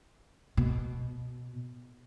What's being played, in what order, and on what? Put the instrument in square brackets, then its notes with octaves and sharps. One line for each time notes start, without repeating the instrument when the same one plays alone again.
[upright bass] B2